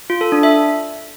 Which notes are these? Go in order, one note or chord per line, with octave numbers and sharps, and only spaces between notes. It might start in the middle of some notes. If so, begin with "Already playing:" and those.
F4
A4
D4
E5